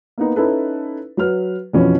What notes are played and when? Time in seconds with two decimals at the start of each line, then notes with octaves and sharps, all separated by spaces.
0.18 A#3 B3 D#4
0.36 C#4 D#4 E4 A4 B4
1.17 F#3 B4 F6
1.73 F2 B2 E3 F3 C#4